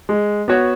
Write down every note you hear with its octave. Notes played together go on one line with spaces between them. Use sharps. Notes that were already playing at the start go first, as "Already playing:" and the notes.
G#3
B3 F#4 C#5